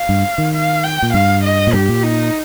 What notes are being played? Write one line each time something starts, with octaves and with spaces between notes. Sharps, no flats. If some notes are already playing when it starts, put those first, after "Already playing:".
Already playing: F5
G2
D#3
F5
G5
A#2
G2 F5
D#5
A#2
G2 G4
A#2
D#4